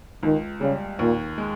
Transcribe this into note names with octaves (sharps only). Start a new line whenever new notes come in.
C#2 D#3
C#3 G3
D#2 A#2
G#3